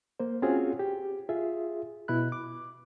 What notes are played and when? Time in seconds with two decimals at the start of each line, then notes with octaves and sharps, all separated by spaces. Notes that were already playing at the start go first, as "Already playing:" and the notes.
0.20 A#3 C5
0.42 C4 C#4 F4 F#4 G#4 C#5
0.79 G4
1.29 F4 G#4 E5
2.08 B2 E4 B5 F#6
2.32 D6